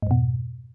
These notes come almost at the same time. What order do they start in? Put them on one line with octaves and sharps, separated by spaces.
G#2 F2 B2